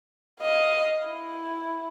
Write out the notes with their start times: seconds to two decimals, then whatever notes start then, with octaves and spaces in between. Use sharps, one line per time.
0.41 D#5 F5
1.06 E4